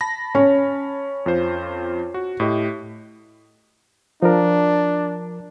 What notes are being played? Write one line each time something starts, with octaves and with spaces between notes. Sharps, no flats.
A5 B5 A#6
C#4
F2 F4 C5
F#4
A2 G4 D#5
F3 D4 A#4